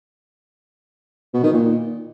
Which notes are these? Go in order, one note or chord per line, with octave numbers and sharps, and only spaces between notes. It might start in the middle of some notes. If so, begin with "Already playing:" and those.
B2
D#3
A#2